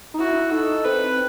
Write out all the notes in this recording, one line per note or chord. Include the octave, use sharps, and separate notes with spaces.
D#4
E4 F#4
D#4 A4
C4 B4